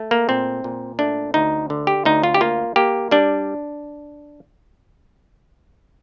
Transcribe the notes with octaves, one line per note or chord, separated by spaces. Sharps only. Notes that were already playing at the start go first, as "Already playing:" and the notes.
Already playing: A3
A#3
A#2 C4
A#2
A3 D4
D2 D#4
D3
G4
D2 D#4
F4
G4
A#3 F4
A#3 G4
G3 D4